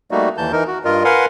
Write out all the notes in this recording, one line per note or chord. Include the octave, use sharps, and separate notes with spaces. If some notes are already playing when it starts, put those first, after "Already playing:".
G3 A3 A#3 D#4 F#4
D#2 E3 A5 G6
E3 D#4 A#4
F#4
G2 F4 A#4 D#5
A#4 B4 F5 F#5 G#5 C6